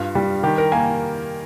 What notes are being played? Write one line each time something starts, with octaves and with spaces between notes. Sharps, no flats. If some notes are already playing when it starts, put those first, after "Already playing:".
Already playing: G2 F4
G3
D#3 G4
A#4
A#3 G#5